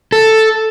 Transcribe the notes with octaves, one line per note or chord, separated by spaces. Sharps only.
A4